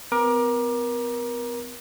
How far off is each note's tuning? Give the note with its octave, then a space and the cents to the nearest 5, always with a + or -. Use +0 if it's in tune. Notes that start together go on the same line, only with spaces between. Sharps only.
B3 +45 A#4 +25 D6 +20